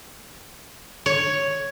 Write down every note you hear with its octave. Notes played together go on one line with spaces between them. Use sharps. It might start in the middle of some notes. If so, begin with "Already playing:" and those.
C#5